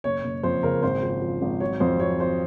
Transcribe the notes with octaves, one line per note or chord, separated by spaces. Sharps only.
F#1 C#5
F#1
F2 C5
C#3 A#4
G#1 C5
F3
F3
G#1
F#3 C#5
F2 C5
F#3 C#5
F#3 C5